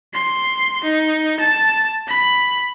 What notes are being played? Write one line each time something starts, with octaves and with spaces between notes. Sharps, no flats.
C6
D#4
A5
B5